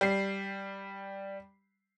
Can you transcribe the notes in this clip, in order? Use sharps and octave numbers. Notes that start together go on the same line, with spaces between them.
G3 C7